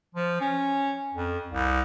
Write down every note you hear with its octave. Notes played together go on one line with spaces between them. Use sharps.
F3
C#4
F2
C2